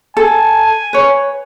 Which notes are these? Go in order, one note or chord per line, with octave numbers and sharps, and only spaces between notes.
A4 G#5
B4 C#5